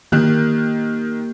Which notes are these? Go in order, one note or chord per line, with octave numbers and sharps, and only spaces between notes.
D#3 A#3 G4 F#6